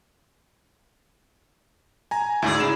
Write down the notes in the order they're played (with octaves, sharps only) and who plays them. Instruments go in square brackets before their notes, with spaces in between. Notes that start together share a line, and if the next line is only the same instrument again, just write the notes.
[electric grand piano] G#5 A#5
[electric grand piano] D2 G#2 [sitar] E4 G#4 D5
[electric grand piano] C#3 E7